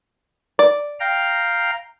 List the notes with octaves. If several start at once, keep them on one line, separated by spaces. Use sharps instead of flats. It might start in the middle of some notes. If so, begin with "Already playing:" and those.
D5
F5 G5 A#5